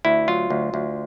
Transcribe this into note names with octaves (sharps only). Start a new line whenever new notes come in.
D2 E4
F#3 F4
D2
D2